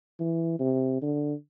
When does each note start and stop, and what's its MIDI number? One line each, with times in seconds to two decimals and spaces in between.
0.20 0.58 52
0.59 0.98 48
1.02 1.34 50